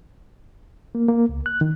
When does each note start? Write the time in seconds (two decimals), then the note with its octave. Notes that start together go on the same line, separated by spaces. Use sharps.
0.95 A#3
1.09 A#3
1.29 C#2
1.46 F#6
1.61 D#3